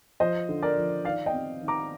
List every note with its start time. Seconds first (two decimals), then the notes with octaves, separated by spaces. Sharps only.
0.20 F3 C5 D#5
0.49 D3
0.63 A#4 D5
0.76 F3
1.05 D#3 D5 F5
1.26 D#5 G5
1.33 C4
1.61 D#3
1.68 A#5 D6